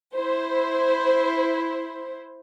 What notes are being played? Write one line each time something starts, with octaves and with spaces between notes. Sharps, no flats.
E4 C5